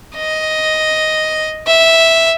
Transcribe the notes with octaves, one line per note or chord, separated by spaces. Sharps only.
D#5
E5